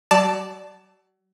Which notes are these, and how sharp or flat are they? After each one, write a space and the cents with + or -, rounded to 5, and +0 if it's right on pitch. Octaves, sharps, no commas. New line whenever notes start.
F#3 +35 D5 +0 A5 +5